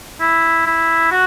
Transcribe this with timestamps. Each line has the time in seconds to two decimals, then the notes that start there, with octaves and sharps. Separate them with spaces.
0.20 E4
0.66 E4
1.11 F#4